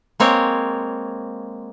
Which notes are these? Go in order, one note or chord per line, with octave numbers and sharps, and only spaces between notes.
G#3 A#3 C4 C#5